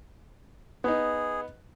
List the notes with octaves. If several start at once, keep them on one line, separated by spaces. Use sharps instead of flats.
B3 D#4 G#4